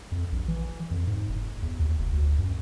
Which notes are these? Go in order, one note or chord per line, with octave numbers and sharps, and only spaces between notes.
F2
A#1
E3
F2
G#2
F#1
E2
D#2
F1
D2
F#2